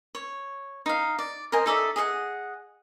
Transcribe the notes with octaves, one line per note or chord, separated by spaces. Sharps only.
C#5
D#4 F5
D5
A#4 C5 D#5 G#5
D#4 A4 D5 E5
G#4 D#5 F5 F#5